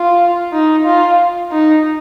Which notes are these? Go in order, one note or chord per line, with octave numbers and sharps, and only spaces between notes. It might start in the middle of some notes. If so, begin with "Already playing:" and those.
Already playing: F4
D#4
F4
D#4